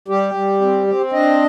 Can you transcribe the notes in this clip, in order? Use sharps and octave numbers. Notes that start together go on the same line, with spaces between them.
G3 G4
G3
C4
C4
D4 D#5